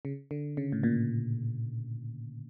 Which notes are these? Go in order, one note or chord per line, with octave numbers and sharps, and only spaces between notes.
C#3
D3
C#3
A2
A#2